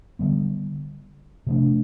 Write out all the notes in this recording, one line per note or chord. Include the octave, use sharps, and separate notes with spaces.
D3 G3 B3
C3 F3 A3 D4